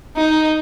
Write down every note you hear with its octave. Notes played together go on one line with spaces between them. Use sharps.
D#4